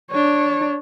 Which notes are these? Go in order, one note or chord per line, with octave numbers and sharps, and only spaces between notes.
D4 C#5